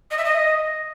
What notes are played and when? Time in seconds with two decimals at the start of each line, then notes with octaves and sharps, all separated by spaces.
0.10 D#5
0.17 E5
0.24 D#5